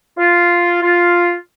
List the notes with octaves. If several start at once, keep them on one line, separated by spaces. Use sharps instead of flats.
F4
F4